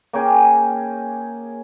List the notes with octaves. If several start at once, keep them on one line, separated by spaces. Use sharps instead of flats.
A#3 C#4 G#4 G5